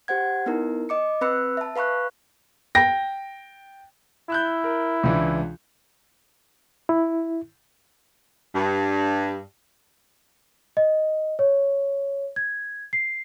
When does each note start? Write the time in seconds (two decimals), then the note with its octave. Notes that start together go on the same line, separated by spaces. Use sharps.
0.08 G4 C5 F#5 G#6
0.46 B3 D#4 E4 A#4
0.89 D#5 D6 C#7
1.21 C4 B4 B5 E6 F#6 C#7
1.57 E5 A5
1.76 B4 F5 B5 C#6 F#6
2.75 G5 A#6
4.30 E4 E6 F#6 G6
4.64 A#4
5.03 C#2 E3 D4
6.89 E4
8.54 G2
10.77 D#5
11.39 C#5
12.36 G#6
12.93 C7